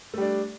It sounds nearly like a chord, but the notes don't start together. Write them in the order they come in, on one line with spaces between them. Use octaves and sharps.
A3 G3 D4